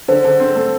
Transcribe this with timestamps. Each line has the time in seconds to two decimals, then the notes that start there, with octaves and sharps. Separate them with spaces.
0.08 D3 C5
0.24 D3
0.40 C4
0.56 A3